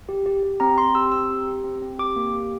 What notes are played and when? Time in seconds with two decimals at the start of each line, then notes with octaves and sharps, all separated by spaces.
0.09 G4
0.26 G4
0.43 G4
0.60 C4 A#5
0.78 C4 C6
0.95 G4 E6
1.12 C4 E6
1.30 G4
1.47 G4
1.64 C4
1.82 C4
1.99 G4 D6
2.16 A#3
2.33 G4